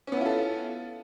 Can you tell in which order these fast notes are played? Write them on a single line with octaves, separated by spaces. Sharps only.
C#4 B3 E4 F4 A4